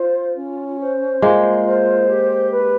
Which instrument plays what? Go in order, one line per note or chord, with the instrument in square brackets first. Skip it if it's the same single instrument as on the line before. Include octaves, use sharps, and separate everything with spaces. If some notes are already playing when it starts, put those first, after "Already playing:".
Already playing: [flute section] F4 C5
C#4
C5
[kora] G#3 A#3 [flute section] F4
[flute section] C5
G4
B4